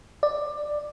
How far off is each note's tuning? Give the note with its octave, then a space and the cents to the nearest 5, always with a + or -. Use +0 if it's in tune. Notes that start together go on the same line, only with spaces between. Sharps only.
D5 +15